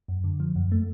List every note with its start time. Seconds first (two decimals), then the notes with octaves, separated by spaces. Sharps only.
0.08 F#2
0.24 D3
0.40 F3
0.56 F#2
0.72 A3